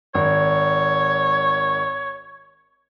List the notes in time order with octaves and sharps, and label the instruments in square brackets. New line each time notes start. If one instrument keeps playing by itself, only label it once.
[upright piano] G#1 [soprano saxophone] C#5